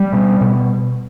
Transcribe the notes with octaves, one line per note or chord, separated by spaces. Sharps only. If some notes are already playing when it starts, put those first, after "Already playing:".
Already playing: G3
B2
B2